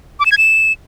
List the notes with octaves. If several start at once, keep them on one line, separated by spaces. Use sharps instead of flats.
D6
E7
G#6
E7